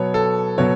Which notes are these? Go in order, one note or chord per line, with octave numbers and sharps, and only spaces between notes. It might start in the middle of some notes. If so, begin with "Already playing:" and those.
Already playing: B2 F#3 B3 C#5
A4
B2 F#3 B3 C#5